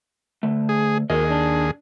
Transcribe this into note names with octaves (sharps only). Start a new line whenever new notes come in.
D3 A3
G#4
D#2 F#4 G#4 A#4 D#5
D4